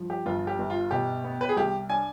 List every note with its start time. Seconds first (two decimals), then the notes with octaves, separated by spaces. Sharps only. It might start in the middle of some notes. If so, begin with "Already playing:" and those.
Already playing: G2 F3
0.10 G4
0.26 G1 F4
0.47 G4
0.59 G1
0.70 F4
0.91 B2 G4
1.24 B3
1.41 B4
1.49 G#4
1.57 C2 G4
1.89 D4 G#5